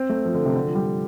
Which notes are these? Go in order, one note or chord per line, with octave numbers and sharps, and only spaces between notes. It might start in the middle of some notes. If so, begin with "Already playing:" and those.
Already playing: C4
A3
F3
D3
C3
D3
F3
G3